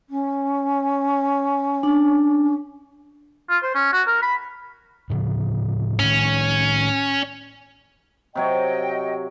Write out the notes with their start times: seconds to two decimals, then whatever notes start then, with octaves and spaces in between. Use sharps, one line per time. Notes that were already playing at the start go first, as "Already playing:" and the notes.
0.09 C#4
1.83 D4
3.49 F4
3.63 C5
3.75 C#4
3.93 F#4
4.07 A#4
4.22 B5
5.10 A2 C#3 F3
5.99 A2 D#3 C#4
8.35 C3 F#3 C#5 D#5 G5